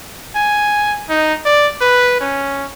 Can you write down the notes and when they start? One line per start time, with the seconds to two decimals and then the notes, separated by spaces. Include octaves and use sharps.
0.35 G#5
1.09 D#4
1.45 D5
1.81 B4
2.21 C#4